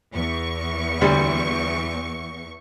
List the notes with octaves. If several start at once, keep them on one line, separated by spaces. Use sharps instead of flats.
E2 C#6
D2 G3